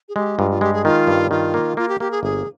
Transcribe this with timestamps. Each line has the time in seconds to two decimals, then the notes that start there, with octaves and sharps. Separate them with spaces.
0.09 G#4
0.16 G#3 G4
0.38 G2 F4
0.51 F4
0.61 G#3 G4
0.73 G#4
0.85 D#3 F4
1.07 G2
1.31 D#3 F4
1.54 A#3
1.77 A#3 F4
1.89 G4
2.00 A#3 G4
2.11 G#4
2.23 G1 G#4